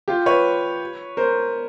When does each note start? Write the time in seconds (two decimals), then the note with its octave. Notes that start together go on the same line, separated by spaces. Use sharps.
0.08 F4 G4
0.26 B4 C#5
1.17 A#4 C5